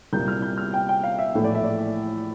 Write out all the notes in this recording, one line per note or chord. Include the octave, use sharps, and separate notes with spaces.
C2 A#2 G3 A#3 G6
F6
G6
F6
G5
G5
F5
E5
A#1 A2 E3 A3
D5
E5
D5